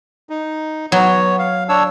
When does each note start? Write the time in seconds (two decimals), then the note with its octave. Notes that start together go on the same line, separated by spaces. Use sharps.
0.30 D#4
0.92 F#3 B3 C#5
1.39 F5
1.69 D4 C#5 E6